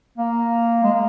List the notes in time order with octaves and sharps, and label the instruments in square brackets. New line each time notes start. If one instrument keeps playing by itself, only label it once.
[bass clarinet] A#3
G#3
A#3